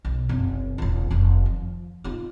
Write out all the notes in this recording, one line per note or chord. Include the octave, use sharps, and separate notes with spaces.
B1
F#1 C3
D#1 C#2
F1 D#2
F3
D#4 F4